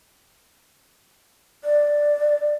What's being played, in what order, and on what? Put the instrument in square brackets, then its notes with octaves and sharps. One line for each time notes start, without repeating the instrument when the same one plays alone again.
[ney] D5